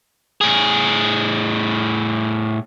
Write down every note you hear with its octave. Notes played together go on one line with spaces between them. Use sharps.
A2 G#4